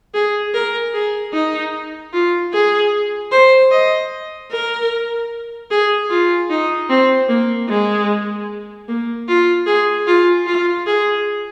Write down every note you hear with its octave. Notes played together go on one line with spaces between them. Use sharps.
G#4
A#4
G#4
D#4
F4
G#4
C5
D#5
A#4
G#4
F4
D#4
C4
A#3
G#3
A#3
F4
G#4
F4
F4
G#4